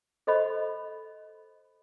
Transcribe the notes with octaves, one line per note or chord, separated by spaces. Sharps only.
A4 C5 D#5 B5